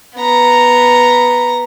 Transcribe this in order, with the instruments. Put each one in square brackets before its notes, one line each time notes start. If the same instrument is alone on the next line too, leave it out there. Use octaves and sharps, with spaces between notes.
[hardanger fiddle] B3 A#5